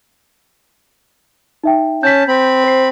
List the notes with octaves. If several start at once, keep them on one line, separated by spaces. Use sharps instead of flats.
D#4 E5 G5
C#4 A5 G6 B6
C4 B5
C5 C7